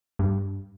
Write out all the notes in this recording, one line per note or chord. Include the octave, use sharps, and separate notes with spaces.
G2